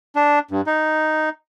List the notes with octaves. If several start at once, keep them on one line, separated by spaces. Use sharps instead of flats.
D4
G2
D#4